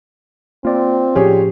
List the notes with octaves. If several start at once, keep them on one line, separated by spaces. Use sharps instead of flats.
A#3 C4 F4 D5
A2 F3 C#4 G4 G#4 C#5